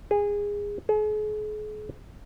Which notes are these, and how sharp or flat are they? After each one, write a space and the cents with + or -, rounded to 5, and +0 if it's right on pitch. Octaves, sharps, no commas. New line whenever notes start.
G#4 -20
G#4 +40